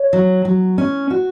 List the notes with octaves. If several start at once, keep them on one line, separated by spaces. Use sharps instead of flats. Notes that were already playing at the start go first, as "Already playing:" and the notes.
Already playing: C#5
F#3
F#3
C#4
F#4